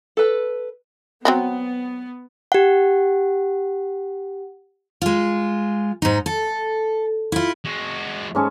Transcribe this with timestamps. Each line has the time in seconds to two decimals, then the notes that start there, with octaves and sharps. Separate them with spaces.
0.17 A4 B4
1.25 F#3 B3 C4 F#4
2.52 G4 F#5
5.02 G#3 F4
6.02 G#2 D#4
6.26 A4
7.32 E4 F4
7.65 G#3 F#4
8.35 G#2 C#4 A4